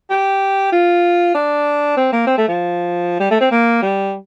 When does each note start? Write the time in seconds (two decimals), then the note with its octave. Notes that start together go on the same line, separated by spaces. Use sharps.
0.10 G4
0.72 F4
1.35 D4
1.97 C4
2.12 A#3
2.27 C4
2.38 A3
2.48 F3
3.20 G3
3.31 A3
3.41 C4
3.51 A#3
3.82 G3